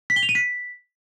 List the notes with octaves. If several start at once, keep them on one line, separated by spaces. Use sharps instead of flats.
B6
G7
F7
D#7
B6